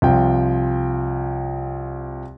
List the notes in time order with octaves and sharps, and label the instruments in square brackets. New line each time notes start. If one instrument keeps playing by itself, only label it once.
[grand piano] C2 F3 G5